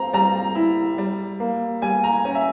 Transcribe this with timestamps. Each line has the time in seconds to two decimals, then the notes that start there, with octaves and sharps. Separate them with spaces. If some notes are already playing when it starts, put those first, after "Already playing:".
Already playing: C4 A#5
0.13 G3 A#5
0.55 E4
0.98 G3
1.40 A#3
1.82 G3 G#5
2.04 A#5
2.25 C#4 G#5
2.35 E5